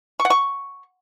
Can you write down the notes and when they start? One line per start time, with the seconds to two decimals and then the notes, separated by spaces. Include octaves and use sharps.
0.20 C#6
0.25 F#5
0.30 C#6